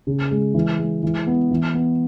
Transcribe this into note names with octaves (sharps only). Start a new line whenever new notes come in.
C#3
G#3
E3
G#3
E3
B3
E3
B3